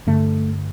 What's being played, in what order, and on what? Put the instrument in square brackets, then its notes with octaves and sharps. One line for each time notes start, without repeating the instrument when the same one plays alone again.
[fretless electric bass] G2 D3 A3